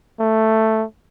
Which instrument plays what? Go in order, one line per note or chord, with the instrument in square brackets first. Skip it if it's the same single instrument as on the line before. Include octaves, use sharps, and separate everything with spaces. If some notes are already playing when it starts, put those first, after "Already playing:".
[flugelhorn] A3